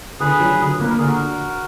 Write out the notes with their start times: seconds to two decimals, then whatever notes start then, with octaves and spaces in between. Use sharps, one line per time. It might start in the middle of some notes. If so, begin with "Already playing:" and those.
0.20 D3 G#4 B4
0.40 F#3
0.60 D3
0.80 A#3 B4
0.89 A#4
0.98 D3 G#4
1.06 F#4 A#4